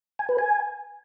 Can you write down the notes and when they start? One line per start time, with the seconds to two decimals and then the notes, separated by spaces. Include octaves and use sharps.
0.19 G#5
0.29 B4
0.38 G#5